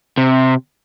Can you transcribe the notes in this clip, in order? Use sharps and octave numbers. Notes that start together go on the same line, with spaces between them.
C3